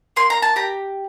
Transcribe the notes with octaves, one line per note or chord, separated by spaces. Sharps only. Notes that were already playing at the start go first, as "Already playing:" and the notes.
A#3 C6
A#5
A5
G4 A#5